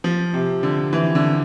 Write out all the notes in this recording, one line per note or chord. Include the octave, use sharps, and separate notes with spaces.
F3
C3
D3
E3
D3